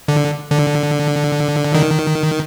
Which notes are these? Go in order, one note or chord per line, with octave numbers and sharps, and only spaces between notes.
D3
D3
D#3